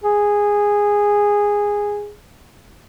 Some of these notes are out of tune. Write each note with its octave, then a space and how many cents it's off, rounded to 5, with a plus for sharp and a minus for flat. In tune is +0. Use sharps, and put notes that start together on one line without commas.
G#4 -10